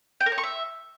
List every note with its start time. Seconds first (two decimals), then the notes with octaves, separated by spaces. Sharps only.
0.20 G5
0.26 A#4
0.32 C#5
0.38 C#6
0.43 E5